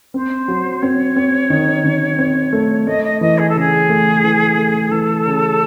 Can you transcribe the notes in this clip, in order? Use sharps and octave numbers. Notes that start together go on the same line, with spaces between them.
C4 C5
F#3
C4 C#5
C4
D#3
D#3
C4
A3
A3 D#5
D#5
E3 D#5
G#4
A4
C#3 G#4
A3
E3
A3
E3 A4
C#3